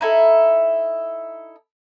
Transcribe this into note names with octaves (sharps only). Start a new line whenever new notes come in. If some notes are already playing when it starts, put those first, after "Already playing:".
D#4 E4 A4